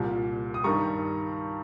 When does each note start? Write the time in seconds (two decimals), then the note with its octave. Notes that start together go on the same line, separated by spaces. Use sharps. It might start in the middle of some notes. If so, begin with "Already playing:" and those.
Already playing: C2 A#2 G3
0.54 D#6
0.64 G2 D#3 G3 A#5 C#6